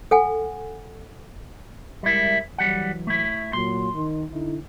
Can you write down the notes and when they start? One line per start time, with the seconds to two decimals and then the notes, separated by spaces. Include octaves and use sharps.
0.11 A4 F#5 G#5
2.03 G3 G#3 E4 A#4 E5
2.58 E3 F#3 G3 F#5
3.07 A3 E4
3.53 A#2 F#3 C6
3.93 D#3
4.31 D3 D#4 E4